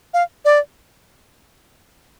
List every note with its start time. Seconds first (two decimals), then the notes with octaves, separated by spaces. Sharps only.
0.14 F5
0.45 D5